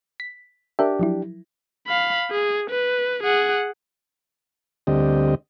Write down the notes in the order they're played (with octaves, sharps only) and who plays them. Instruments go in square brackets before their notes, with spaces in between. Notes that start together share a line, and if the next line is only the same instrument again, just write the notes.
[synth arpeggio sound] B6
[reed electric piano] D4 G4 [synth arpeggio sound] A#4 E5
[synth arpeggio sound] F3 F#3 E4
[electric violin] F5 B5
G#4
B4
G#4 F#5
[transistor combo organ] D2 D3 G3 C4 G4 D#5